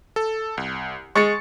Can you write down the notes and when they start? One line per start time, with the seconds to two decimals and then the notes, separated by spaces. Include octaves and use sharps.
0.16 A4
0.57 C2
1.15 G#3 C#6 A6 C#7